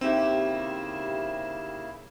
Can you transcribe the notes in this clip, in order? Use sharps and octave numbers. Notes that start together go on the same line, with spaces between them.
C#3 A#3 C4 D#4 E4 G4 E5 E7